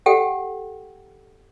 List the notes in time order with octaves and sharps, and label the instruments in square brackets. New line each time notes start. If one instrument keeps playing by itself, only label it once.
[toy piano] G4 A4 F#5 G5